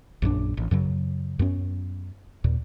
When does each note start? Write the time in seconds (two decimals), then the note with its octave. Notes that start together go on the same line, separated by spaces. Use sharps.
0.22 A#1 F#2 C#3 D4
0.57 A1
0.71 F#2 C#3 F#3
1.39 F#2 B3 C#4
2.44 D#2 A#2